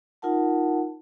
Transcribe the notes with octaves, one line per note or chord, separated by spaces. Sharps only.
D#4 F4 A#4 F#5 A5